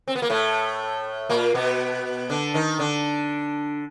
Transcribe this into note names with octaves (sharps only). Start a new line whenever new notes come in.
C4
B3
A#3
A2 A3
A#2 A#3
B2 B3
D3 D4
D#3 D#4
D3 D4